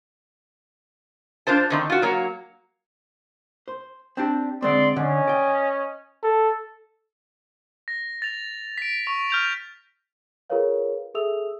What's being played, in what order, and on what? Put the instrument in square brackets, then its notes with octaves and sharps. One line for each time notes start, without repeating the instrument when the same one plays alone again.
[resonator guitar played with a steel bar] D4 F4 C5 A5
D3 D#3 C4
F4 F#4
F#3 A#3 C#5
[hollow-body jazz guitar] C5
C4 D4 G4
[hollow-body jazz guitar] D3 G#3 C4 [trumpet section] D5 C6
[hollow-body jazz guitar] D3 [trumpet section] C#4 D#5
[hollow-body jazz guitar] D5 G5
[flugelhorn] A4
[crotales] A#6
A6 F7
B6 D7
C#6 F7
F6 G6 F7
[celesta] F4 G#4 A#4 B4 C#5 F5
G#4 A4 E5 D#6 E6 F7